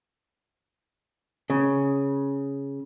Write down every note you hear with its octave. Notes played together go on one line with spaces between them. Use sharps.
C#3